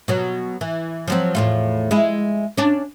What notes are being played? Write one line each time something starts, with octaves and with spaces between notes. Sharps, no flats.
B2 F#3
E3
F3 F#3 C4
E2 A2 F4
G#3 E4
C#4 D4